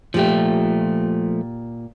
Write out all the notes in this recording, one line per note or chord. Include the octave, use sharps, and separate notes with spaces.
A#2 F3 A3 G4